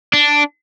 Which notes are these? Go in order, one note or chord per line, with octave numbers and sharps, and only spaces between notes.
D4